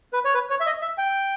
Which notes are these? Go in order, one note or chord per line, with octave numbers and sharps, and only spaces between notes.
B4
C#5
B4
C#5
E5
D#5
E5
G5